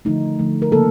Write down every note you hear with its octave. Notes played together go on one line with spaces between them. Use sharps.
D3 F3 A3 D#4
D3 F3 A3
A#4
C#3 F3 A#3 A4